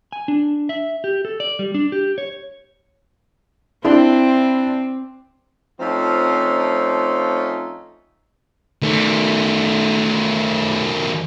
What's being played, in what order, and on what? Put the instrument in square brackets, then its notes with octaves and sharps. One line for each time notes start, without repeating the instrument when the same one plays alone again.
[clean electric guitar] G#5
D4
E5
G4
A4
D5
G3
D4
G4
C#5
[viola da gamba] C4 [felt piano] D4 E4
[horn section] F3 A3 C4 C#4 D#4 F4
[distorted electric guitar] D#3 A3